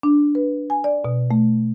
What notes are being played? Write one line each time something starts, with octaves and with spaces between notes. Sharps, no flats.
D4
B4
G#5
D5
B2
A3